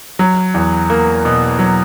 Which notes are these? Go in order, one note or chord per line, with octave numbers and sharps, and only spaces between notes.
F#3
E2
A#3
B2
F#3